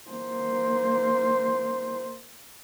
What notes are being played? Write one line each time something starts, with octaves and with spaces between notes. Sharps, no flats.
A#3 C5